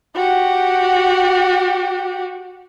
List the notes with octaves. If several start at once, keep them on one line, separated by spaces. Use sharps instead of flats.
F#4 G4